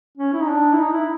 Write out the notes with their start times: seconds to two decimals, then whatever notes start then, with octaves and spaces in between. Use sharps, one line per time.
0.18 C#4
0.33 E4
0.41 D#4
0.48 D4
0.73 E4
0.78 D#4
0.93 E4